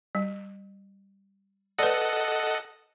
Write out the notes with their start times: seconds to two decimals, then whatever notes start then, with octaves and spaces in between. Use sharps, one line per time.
0.15 G3
1.78 A4 B4 D5 D#5 F#5